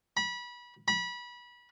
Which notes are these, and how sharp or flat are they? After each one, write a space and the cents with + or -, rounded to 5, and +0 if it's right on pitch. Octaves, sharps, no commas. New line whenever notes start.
B5 -25
B5 -25